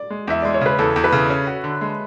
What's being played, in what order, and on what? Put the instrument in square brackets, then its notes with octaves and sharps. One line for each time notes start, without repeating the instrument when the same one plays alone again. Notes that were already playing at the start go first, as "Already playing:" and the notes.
Already playing: [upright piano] D5
[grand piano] G#3
[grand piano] E2 [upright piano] E5
[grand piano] G#3 [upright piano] D5
[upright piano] C#5
[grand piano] C#3 [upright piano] B4
[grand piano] E2 [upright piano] A4
[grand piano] E2
[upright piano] B4
[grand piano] C#3
C#4
F#4
D3
G#3